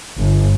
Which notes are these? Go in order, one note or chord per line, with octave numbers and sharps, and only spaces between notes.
G1